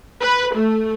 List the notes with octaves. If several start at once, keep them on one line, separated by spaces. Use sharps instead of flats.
B4
A3